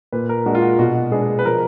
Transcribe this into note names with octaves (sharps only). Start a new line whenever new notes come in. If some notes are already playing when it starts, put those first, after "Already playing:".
A#2 B4
A#4
G#3 D4 F#4
F4
F#4
B2 F#4
G#3 B3 D4 G#4
B4
F3 A#4